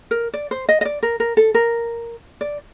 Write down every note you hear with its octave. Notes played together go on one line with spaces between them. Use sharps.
A#4
D5
C5
D#5
D#5
D5
A#4
A#4
A4
A#4
D5